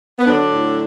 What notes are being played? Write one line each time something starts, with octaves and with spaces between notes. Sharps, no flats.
B3
D3 F#3 D4
A2